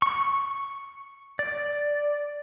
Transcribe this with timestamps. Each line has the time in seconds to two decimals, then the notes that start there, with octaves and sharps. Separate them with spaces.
0.02 C#6
1.39 D5